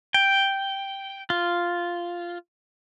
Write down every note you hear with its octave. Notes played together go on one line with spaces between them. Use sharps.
G5
F4